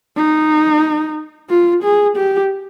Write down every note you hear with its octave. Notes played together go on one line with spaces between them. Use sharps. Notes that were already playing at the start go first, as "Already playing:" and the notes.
D#4
F4
G#4
G4